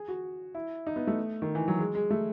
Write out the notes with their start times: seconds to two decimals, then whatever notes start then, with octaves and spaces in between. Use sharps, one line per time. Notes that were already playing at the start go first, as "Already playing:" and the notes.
Already playing: G#4
0.08 F#4
0.55 E4
0.87 D#4
0.96 B3
1.07 A3
1.42 D#3
1.55 E3
1.68 F#3
1.79 G#3
1.95 G#3
2.10 A3